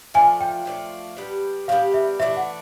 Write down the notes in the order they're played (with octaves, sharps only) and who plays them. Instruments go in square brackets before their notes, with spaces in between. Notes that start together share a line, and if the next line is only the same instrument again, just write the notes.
[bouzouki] F3 A3 D4 F4 [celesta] G#5
[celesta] G5
[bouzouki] F3 A3 D4 F4
G3 B3 D4 G4
[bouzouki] G3 B3 D4 G4 [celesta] F5
[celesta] E5
[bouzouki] E3 A3 D4 [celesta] E5
[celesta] F#5